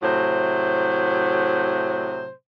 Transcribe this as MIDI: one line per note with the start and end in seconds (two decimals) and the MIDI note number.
0.03 2.31 45
0.03 2.31 48
0.03 2.31 54
0.03 2.31 72